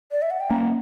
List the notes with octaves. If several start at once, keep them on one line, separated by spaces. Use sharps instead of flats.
D5
E5
F#5
G5
A#3 C#4 A#5